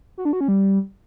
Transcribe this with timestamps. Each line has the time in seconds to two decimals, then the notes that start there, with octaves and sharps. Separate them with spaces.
0.18 F#4
0.25 D4
0.33 F#4
0.41 C#4
0.48 G3